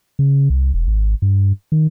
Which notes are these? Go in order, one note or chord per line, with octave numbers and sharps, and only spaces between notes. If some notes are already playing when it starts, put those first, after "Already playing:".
C#3
C2
E1
G#1
G2
D#3